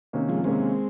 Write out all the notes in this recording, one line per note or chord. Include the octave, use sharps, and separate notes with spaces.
C3 D#3 A#3 C#4
F3 G#3
C3 D#3 G#3 A#3 C4 C#4